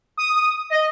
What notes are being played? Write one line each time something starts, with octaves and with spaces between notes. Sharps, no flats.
D#6
D#5